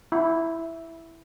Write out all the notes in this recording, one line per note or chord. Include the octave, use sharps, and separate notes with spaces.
E4